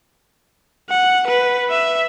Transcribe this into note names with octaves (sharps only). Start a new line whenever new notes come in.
F#5
B4
E5